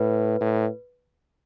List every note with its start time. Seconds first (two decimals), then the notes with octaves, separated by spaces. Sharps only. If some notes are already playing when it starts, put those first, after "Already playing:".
Already playing: A2 B4
0.41 A2